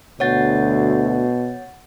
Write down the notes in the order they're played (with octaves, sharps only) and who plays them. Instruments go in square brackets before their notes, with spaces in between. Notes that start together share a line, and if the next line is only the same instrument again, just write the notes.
[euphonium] D2 [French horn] B2 [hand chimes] C#5 F#5 A6